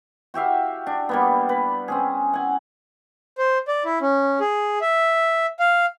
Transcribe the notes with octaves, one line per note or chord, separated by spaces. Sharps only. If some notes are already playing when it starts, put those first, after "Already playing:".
F#4 G4 E5 F5
D4
G3 A#3 B3
B4
C4 C#4 G#4
F#5 G#5
C5
D5
E4
C#4
G#4
E5
F5